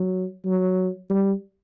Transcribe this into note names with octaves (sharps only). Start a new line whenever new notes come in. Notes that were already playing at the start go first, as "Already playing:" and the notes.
Already playing: F#3
F#3
G3